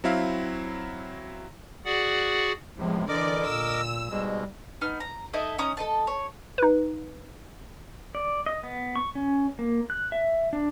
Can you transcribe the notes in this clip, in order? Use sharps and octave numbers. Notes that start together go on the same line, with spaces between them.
F#3 C4 E4 E5 F5
F#4 G#4 D5 F#5
E2 A2 C3 F3 G#3
D3 E3 A#4 D5 D#5 D6
A#2 E6
G#2 B2 G3 G#3
B3 D#4 F6
A#5
D#4 E4 A4 D#5
C#4 D#4 A#5 D#6
A4 D#5 A5
C#5
D#4 B4
D5
D#5
B3
C#6
C#4
A#3
F#6
E5
D4